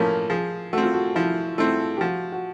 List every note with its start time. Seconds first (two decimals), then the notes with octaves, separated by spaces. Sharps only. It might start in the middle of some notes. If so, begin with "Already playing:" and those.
Already playing: A2 F3 A#3 C#4 A#4
0.30 F3 G#4
0.73 A3 C4 F#4
0.83 F4
0.93 F#4
1.15 F3 E4
1.58 A3 C4 E4
1.97 G4
2.01 F3 F#4
2.32 F#4